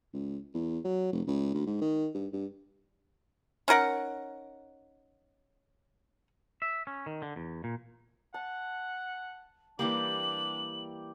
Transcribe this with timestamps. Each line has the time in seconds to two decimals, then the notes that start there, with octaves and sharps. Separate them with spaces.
0.13 C#2
0.54 E2
0.84 F#3
1.12 F1
1.27 C#2
1.54 D2
1.66 G#2
1.81 D#3
2.14 G2
2.33 G2
3.68 C#4 D#4 A#4 F#5
6.62 E5
6.87 C#4
7.06 D#3
7.22 D3
7.36 E2
7.64 A#2
8.34 F#5 A5
9.79 E3 G3 A#3 D4 G4 D6 F#7